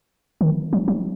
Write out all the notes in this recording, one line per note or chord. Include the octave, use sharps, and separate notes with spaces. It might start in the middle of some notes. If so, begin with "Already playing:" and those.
D#3
F#3
F#3